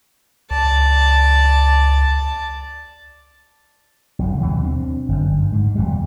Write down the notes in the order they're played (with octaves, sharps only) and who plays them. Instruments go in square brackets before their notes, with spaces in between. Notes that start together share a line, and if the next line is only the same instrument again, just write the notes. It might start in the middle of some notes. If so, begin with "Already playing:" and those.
[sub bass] C#2 [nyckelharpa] D5 A5
[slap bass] F#1 B1
D#2 B2 E3 F3
C4 D4
G1 F#2
G#2
D#1 F2 B2 G3